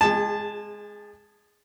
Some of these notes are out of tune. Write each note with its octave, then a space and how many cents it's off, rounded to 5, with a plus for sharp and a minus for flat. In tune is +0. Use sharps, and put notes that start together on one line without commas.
G#3 +0 G#4 -35 A5 +0